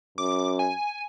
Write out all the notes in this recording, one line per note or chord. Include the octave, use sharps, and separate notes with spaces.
F#2 D6
G#5